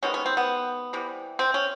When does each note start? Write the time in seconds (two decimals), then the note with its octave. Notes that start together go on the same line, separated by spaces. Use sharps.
0.03 C3 D#3 G#3 B3 C#4
0.14 C#4
0.26 C4
0.37 B3
0.93 C3 E3 G3
1.39 C4
1.54 C#4